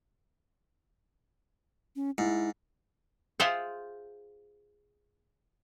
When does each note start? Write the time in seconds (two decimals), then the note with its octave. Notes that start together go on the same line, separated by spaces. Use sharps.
1.96 C#4
2.18 G#2 E4
3.40 F4 G#4 C5 E5 F#5 G5